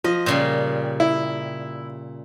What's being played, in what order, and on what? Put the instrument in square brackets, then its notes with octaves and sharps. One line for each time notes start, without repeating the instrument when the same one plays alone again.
[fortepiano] F3 [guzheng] D#5
[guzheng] A#2 C#3 G3
[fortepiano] E4